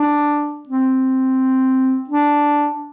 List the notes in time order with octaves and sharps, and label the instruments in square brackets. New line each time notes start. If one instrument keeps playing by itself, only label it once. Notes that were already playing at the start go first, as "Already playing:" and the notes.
Already playing: [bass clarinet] D4
C4
D4